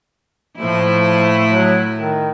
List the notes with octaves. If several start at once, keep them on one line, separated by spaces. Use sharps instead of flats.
A2 F3 A3 E4
F#3
D#3